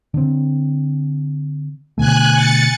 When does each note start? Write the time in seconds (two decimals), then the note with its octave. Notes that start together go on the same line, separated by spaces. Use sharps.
0.14 D3 C4
1.98 B2 D3 A3 G#5 F#6
2.34 A6 C#7